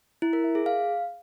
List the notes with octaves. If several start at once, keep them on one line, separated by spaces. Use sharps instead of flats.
E4
A#4
E5
G#4
F5